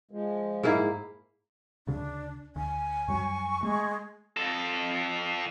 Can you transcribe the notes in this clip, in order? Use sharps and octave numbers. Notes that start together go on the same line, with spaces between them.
F3 G#3
G#2 A#3 E4
D2 C#3 D4
D2 G#5
F#2 F#3 G3 C#6
G#3 A3
F2 A4